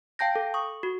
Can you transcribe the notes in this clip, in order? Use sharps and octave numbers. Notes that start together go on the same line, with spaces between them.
F5 G5 A5 G6 A#6
A4
C#6 D#6
F#4